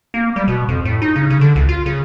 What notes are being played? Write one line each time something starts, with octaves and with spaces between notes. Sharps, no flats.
A#3
G3
B2
F2
A2
D#4
C#3
C#3
D3
C#2
F4
C#3